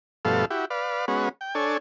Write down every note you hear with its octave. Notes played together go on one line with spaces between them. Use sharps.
G2 B2 F3 A3 A4 F5
E4 F#4 G4
B4 D5 F5
G#3 B3 C#4 F#4
G5
D4 A4 C#5 G#5